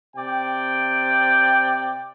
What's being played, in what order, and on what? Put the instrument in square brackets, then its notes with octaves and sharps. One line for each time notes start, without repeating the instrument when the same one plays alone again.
[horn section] C3 D5 G5